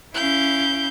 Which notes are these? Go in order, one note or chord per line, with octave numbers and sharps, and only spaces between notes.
C#4 E4 F5 G6